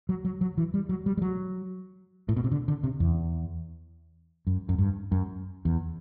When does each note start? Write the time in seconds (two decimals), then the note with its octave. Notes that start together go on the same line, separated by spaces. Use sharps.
0.09 F#3
0.25 F#3
0.41 F#3
0.58 E3
0.74 G3
0.89 F#3
1.06 G3
1.17 G3
1.22 F#3
2.29 A2
2.37 B2
2.44 C3
2.51 D3
2.68 D3
2.84 C3
3.00 E2
4.47 F#2
4.69 F#2
4.78 G2
5.12 F#2
5.65 E2